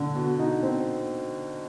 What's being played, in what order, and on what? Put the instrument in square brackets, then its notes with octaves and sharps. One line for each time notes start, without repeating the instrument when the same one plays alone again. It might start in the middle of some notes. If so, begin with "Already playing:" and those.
Already playing: [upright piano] D3
B2
D#4
C4